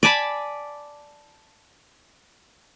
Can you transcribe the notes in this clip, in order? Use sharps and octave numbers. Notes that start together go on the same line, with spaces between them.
D5 G#5 A5 B5